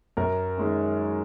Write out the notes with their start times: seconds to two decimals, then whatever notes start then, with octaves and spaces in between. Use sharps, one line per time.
0.17 F#2 A#4
0.58 D#3 G#3 C#4